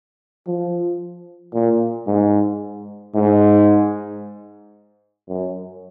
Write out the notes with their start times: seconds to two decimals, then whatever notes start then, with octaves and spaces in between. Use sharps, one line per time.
0.47 F3
1.54 A#2
2.07 G#2
3.14 G#2
5.28 F#2